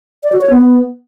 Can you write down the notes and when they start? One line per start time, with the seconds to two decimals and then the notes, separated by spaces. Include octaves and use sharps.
0.23 D5
0.32 F#4
0.41 C#5
0.50 B3